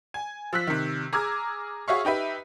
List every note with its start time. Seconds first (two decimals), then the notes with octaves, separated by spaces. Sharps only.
0.14 G#5
0.53 F3 E6 F#6 B6
0.67 C3 D#3
1.13 G#4 A#5 D6 E6 F6 G#6
1.88 F#4 G#4 C#5 E5 F5 C#6
2.05 D#4 G4 B4 E5